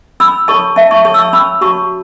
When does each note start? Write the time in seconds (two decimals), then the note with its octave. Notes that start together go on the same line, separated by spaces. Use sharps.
0.20 C#4 B5 E6
0.48 A4 C#5 A5 C#6
0.76 C#4 E5 A5
0.91 A5 C#6
1.05 A4 C#5 A5 C#6
1.14 E6
1.19 A5 C#6
1.33 C#4 B5 E6
1.61 F#4 C#5 A5 C#6